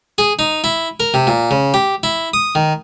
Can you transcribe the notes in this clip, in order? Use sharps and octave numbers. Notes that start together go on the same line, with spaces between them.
G#4
D#4
E4
A#4
C3
A#2
C#3
G4
E4
D#6
D#3